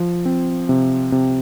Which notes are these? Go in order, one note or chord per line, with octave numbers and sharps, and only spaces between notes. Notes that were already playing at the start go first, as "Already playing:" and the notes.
Already playing: F3
C4
C3
C3